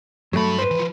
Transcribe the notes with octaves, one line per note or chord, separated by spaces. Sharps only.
G2 F#3 A3 B5
B4 C5
E3 F3